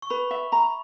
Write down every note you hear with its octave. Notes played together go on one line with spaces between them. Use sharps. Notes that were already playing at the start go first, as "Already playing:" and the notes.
C#6
B4 B5
E5
A#5 B5